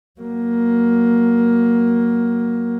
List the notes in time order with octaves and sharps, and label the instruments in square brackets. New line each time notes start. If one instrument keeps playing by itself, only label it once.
[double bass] F#3 A#3